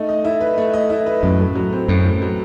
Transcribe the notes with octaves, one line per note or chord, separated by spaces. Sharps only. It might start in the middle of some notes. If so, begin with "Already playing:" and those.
Already playing: A3 D#4
D#5
E4
B4
A3
D#5
E4
B4
F#2 A2
A2
F#3
C4
F#2 A2
A2
F#3